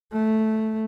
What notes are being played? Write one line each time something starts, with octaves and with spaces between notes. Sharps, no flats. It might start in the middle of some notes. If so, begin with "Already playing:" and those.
A3